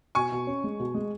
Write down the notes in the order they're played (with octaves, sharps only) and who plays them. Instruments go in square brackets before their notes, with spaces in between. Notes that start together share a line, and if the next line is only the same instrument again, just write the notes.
[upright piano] B2 [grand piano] G#5 C#6
[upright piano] B2
C#4
G#3
B2
G#3